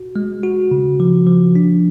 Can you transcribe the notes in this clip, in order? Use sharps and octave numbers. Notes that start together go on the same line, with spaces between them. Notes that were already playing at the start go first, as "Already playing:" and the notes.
Already playing: F#4
G#3
F#4
C#3
F3
F3
D4